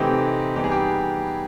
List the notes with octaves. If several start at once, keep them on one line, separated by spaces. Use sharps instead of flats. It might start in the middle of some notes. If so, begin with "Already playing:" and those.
Already playing: C3 E3 A3 C4 D#4 G4
E3 G3 B3 D#4 G4
G#4
G4